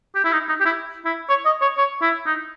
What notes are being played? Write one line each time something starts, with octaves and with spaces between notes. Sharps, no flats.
G4
E4
D#4
D#4
G4
E4
E4
C#5
D#5
C#5
C#5
E4
D#4